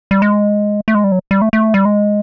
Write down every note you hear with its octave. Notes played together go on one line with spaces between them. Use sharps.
G3
G#3
A3
G#3
G3
F#3
G3
A3
A3
G3
G#3